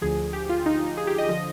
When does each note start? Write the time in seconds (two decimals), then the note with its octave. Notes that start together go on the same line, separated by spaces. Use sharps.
0.01 D2 D3 F3 G#4
0.33 G4
0.49 F4
0.66 D#4
0.86 D#4
0.97 G#4
1.07 G4
1.18 D#5
1.29 D3 F3 D#5